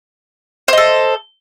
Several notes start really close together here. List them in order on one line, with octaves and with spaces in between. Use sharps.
C5 D#5 A4